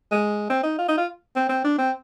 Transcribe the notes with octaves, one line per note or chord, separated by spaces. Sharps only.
G#3
C4
D#4
F4
D#4
F4
C4
C4
D4
C4